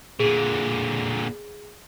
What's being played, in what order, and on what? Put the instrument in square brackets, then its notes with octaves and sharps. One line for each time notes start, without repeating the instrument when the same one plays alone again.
[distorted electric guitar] A#2 D3 [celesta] G#4